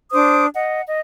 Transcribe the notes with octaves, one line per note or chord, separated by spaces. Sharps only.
D4 C5 D6 D#6
D#5 F#5
D#5